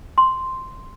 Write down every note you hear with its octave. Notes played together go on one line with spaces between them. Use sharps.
C6